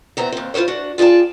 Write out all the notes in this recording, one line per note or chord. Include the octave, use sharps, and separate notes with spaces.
E2 B3 C4 A#5
D#2 C4
E4 F4 A#4 C5 C#5
D4 F#4
F4 G#4 D5 G5 A5